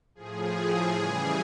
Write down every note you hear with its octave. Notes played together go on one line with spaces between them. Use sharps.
A2 F3 G#4
C#3 E3 G3 G#4